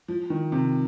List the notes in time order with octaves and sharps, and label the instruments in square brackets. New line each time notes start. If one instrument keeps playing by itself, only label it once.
[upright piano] F3
D#3
C3